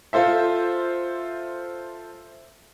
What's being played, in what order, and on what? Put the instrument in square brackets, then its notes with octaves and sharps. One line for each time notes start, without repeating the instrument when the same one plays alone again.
[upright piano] F4 A4 C5 E5